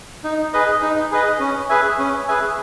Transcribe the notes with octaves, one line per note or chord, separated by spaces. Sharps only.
D#4
G#4 B4 D#5
D#4
G#4 B4 D#5
C#4
G#4 B4 E5 G#5
C#4
G#4 B4 E5 G#5